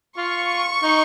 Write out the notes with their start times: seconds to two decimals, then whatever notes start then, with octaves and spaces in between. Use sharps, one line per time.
0.18 F4 C#6
0.83 D#4